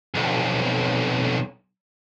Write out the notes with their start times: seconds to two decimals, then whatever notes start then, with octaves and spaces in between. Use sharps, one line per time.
0.15 B1 F2